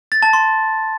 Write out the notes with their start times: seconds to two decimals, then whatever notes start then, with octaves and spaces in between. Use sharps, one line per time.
0.12 A6
0.23 A5
0.33 C6